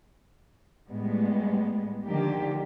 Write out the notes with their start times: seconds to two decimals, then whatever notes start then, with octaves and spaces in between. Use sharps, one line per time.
0.89 A2 G3 G#3 B3
2.06 D3 D#3 F3 A#3 G4